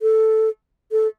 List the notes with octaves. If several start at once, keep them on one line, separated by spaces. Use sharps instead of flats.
A4
A4